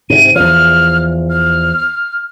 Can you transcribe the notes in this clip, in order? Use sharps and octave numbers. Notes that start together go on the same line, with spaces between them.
G#2 C3 D#7
E2 F3 F6
F6